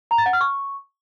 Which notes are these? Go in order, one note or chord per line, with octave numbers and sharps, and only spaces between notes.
A#5
A6
F#5
F6
C#6